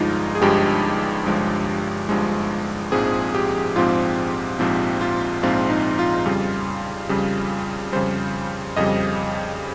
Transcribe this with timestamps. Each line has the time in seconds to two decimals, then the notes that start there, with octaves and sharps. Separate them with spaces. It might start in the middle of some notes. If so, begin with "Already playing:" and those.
Already playing: G1 G2 F3 G#3 D#4 F4
0.35 G#4
0.41 G1 G2 F3 G#3 G4
1.26 G1 G2 F3 G#3
2.09 G1 G2 F3 G#3
2.92 A#1 G#2 F3 C4 G#4
3.35 G4
3.76 A#1 G#2 F3 C4 F4
4.59 A#1 G#2 F3 C4
5.01 F4
5.43 A#1 G#2 F3 C4 F4
5.70 D#4
5.99 F4
6.25 F2 C#3 G3
7.09 F2 C#3 G3
7.92 F2 C#3 G3 C5
8.77 F2 C#3 G3 D#5